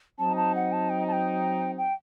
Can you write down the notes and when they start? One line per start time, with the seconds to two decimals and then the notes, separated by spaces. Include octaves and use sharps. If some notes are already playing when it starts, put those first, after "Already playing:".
0.19 F#3 C4 D#4 A5
0.37 A5
0.55 F#5
0.72 A5
0.90 G5
1.08 A5
1.12 G5
1.78 G5